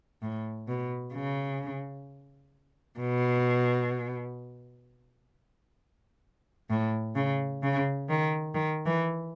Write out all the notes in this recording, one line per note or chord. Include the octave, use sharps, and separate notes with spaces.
A2
B2
C#3
B2
A2
C#3
C#3
D#3
D#3
E3